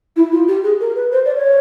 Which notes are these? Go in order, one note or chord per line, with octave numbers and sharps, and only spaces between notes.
E4
F4
G4
G#4
A#4
B4
C5
D5
C#5